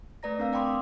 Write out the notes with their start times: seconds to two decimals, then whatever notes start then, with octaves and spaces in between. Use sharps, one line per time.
0.23 A3 B4 D5 A#5 A#6
0.38 A3 C4 D4 A#4 F5 E6
0.53 D5 G5 B5 C6 D6 D#6